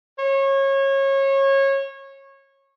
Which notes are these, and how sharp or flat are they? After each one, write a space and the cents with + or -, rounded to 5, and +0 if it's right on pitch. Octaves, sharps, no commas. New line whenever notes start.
C#5 -25